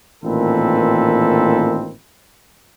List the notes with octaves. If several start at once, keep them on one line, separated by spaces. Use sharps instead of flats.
A1 A#2 D#3 C4 A4 B4